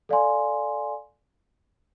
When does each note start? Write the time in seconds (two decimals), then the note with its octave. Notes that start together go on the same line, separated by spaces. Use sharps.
0.09 A4 D5 F5 G#5 C6